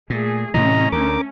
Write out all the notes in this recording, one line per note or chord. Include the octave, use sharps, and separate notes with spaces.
A#2 A3 G#4
A2 C3 E3 A3 C#4 D#5 A#5
D2 A#4 D6